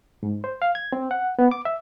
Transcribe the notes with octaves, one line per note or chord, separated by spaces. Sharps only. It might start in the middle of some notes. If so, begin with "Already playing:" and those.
G#2
C5
F5
G#6
C4
F#5
B3
D6
E5